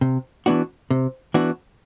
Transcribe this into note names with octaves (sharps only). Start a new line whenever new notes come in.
C3
E3 B3 D4 F#4
C3
E3 B3 D4 F#4